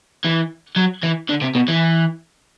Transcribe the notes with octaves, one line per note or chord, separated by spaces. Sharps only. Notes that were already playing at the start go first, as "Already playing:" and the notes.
E3
F#3
E3
D3
C3
B2
E3